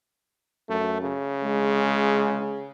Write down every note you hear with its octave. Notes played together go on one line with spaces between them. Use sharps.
F#2 A3
C#3
G#3